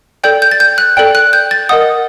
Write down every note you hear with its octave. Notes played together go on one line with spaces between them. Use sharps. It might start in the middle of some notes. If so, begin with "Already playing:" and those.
A4 D5 G5 G6
G6
A6
G6
F#6
A4 D5 G5
F#6
G6
A6
A#4 D#5 F#5 D#6